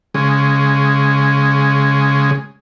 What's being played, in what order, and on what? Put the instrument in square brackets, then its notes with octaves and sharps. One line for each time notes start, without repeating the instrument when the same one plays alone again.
[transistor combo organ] C#3 G#3